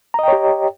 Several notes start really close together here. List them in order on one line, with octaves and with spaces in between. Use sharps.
A#5 D#5 G5 C#5 G4